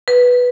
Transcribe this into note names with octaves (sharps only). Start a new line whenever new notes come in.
B4